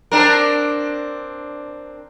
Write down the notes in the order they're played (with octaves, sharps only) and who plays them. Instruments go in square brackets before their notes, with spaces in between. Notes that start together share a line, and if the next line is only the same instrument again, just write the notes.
[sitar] C4 D4 A#4